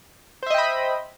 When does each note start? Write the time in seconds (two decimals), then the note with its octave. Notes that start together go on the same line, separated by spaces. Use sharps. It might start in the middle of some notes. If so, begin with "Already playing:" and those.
0.43 C5
0.46 E5
0.50 D#5
0.54 G5
0.58 B5